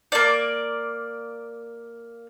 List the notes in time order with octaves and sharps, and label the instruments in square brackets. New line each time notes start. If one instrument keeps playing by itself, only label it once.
[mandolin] A#3 D5